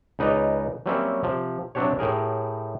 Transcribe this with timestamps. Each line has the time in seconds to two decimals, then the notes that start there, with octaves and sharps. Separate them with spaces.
0.19 C#2 D#4 B4 D5 D#5 A#5
0.86 F#3 G3 A#3 C4 C#4 E5
1.23 C3 F3
1.75 C3 F#3 C4 D4 G4 C#5
1.99 A2 G4 G#4 A#4